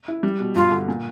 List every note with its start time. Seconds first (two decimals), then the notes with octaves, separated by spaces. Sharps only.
0.08 E4
0.23 G3
0.40 B2
0.55 G2 F4
0.71 D3
0.88 A#2